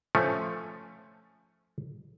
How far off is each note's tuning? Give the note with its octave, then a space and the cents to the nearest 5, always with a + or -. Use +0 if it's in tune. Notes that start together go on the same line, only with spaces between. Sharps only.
F3 +0 A3 +0 C#4 +0